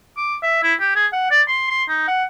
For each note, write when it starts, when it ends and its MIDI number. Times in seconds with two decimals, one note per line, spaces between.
0.17 0.35 86
0.42 0.62 76
0.63 0.74 64
0.80 0.92 67
0.95 1.06 68
1.13 1.27 78
1.30 1.42 74
1.48 1.66 84
1.69 1.82 84
1.88 2.04 63
2.08 2.24 78